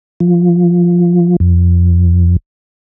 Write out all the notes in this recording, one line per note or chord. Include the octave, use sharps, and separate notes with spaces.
F3
F2